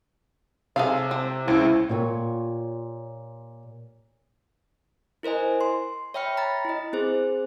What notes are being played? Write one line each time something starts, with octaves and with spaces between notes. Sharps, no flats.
C3 G#4 A4 F5
C4
C#2 C#3 C4 E4
A#2 F4 G4 C#5
E4 A#4 C5 D#5 G#5
C6
C#5 E5 G5 B5 F6 C#7
A#5 B5 A6
E4 D#5
C4 G#4 C5